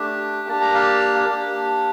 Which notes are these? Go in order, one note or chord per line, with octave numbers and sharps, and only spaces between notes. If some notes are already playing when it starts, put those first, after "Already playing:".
Already playing: A3 D4 G4
A#3 D4 G4 A5
A#5
F5 A5
A#3 D4 G4